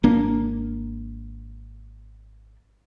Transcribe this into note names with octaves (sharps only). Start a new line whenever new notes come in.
G#1 A#3 D4